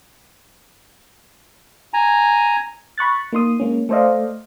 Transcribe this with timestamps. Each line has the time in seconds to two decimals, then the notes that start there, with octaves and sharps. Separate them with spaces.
1.94 G#5 A#5
2.98 B5 C#6 F#6 A6
3.32 A#3 D#4 C6 D#6
3.60 G#3 A#3 C#4
3.89 A3 A4 C5 D5 D#5 F5